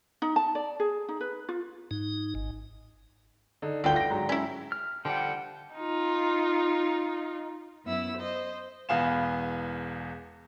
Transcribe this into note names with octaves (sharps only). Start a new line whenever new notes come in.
D#4
A5
D5
G#4
D#4
B4
F4
G#2 D#4
G#1
D3 D#4
G1 D2 D3 F4 G5
A#6 D7
G#2 F#3
C#4 E4
F6
D3 F3 G3 F#5 G5
D#4 F4
F#2 B3 E4 E5 E6
C5 D#5
E1 E2 B3 F5 G#5 E7